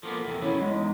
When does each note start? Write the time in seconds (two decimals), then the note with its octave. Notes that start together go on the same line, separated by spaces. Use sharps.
0.03 F3 A#3 B3 A4
0.25 E2 C3 A4
0.41 F#2 C#3 B3 E4 C#5
0.61 E2 G#3
0.75 D#4